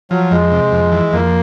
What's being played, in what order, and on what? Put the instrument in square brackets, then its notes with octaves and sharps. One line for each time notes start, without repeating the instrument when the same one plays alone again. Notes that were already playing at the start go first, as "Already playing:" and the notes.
[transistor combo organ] F3 [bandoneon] F#3
[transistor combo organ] F2 [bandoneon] G#3
[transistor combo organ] C3
F2
E3
[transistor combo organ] F2 [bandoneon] A#3